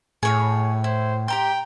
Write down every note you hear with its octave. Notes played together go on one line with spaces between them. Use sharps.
A2 G#4 C#5 F5
E4 C5
G4 G5 A#5 C6